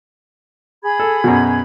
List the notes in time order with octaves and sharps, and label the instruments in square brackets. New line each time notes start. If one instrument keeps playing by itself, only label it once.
[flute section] G#4 B5 G#6
[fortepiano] A4
F#2 B2